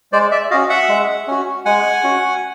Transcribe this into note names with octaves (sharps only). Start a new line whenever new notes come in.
G#3 C5 D5
D5 E5
C#4 F#4 D#5 F5
E5 F#5
G#3
C#4 F#4
G#3 F#5 G#5
C#4 F#4